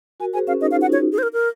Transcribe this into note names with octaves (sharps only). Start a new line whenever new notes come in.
F#4 A#4 G#5
G#4 C5 G#5
C#4 F5
D#4 D#5
F5
F4
F#5
D#4 F#4 C#5
G#4
C5
A#4
A#4